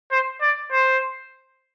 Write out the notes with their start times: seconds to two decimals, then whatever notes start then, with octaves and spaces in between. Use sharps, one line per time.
0.11 C5
0.41 D5
0.72 C5